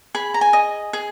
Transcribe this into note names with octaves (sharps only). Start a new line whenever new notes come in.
G#4 B5
A#5
G#5
D#5
G#4